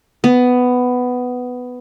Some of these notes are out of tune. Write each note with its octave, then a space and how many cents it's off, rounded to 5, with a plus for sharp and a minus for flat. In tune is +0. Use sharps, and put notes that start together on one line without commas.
B3 +10